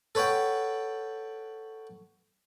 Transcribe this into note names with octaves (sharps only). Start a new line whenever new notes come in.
A4 B4 C#5 F#5 G5